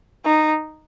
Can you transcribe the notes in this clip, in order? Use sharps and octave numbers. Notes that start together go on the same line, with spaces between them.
D#4